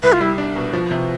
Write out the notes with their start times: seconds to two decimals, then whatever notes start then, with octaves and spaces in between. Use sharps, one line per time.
0.03 C2 B4
0.13 F4
0.20 G3 E4
0.38 D4
0.56 B2
0.73 F3
0.91 C3